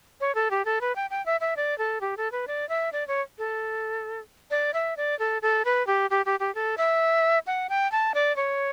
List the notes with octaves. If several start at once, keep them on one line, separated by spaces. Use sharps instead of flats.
C#5
A4
G4
A4
B4
G5
G5
E5
E5
D5
A4
G4
A4
B4
D5
E5
D5
C#5
A4
D5
E5
D5
A4
A4
B4
G4
G4
G4
G4
A4
E5
F#5
G5
A5
D5
C#5